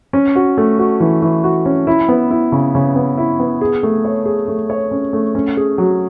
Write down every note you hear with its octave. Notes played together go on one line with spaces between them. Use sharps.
C#4
F#4
A3
F#4
E3
E3
F#4
C#4
E4
B3
E4
C#3
C#3
B3
E4
B3
G#4
A3
C#5
G#4
A3
C#5
C#4
A3
C#4
G#4
F#3